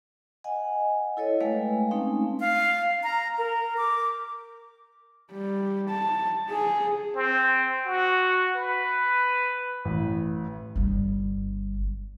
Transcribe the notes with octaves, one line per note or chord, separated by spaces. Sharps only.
D#5 F#5 G#5
E4 A4 C#5 D#5
G#3 A3 B4 F5 G5 G#5
G#3 A3 C4 C#4 D#4 F5
F5
A#5
A#4
D6
G3
A5
G#4
C4
F#4
B4
A1
G1 G3